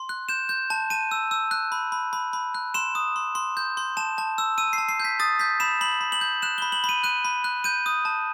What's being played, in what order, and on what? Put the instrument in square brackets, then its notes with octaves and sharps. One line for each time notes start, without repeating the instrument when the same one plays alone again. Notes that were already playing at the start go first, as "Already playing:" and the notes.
Already playing: [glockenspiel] C6
F#6
G6 E7
G6
A5
A5 D#7
E6
E6
F#6
B5
B5
B5
B5
F#6
C6 E7
D#6
C6
C6
G6
C6
A5 E7
A5
E6
E6 D#7
C7
A5
C7
G6 B6
D#6 A6
G6 B6
B5 E7
B5 F#7
B5
F#7
G6
F#6 E7
B5 G7
F#7
B5
D#7
F#6 D#7
B5
F#6
G6 D#7
D#6
A5